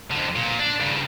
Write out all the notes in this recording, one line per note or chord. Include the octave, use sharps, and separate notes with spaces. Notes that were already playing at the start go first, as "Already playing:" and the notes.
F2 D3
A#2
D4
G2 C#3